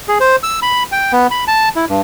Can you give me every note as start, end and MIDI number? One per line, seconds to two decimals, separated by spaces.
0.08 0.18 68
0.20 0.36 72
0.43 0.60 88
0.62 0.83 83
0.92 1.12 79
1.12 1.27 59
1.31 1.44 83
1.48 1.69 81
1.76 1.85 64
1.89 2.01 43